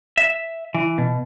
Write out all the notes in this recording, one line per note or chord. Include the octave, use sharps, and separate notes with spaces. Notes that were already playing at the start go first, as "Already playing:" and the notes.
E5
E3
B2